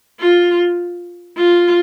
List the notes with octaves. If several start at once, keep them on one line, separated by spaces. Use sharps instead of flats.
F4
F4